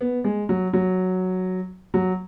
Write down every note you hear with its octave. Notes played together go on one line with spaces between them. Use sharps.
B3
G#3
F#3
F#3
F#3